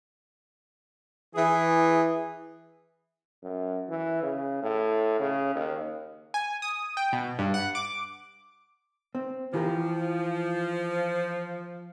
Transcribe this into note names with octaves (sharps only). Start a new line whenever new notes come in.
E3 G#4
F#2
E3
C#3
A2
C#3
D#2
G#5
D#6
G5
B2
G2
F#5
D6
C4
E3 F3 G4 A#4